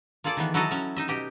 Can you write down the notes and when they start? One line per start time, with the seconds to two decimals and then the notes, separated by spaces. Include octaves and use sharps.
0.24 A#3 F4 G#4 A4 D5
0.37 D#3 E3 B3
0.54 F#3 E4 F#4 A4 D#5 A#5
0.71 F#3 C#4
0.96 D#4 D#5 E5
1.08 B2 G4 D#5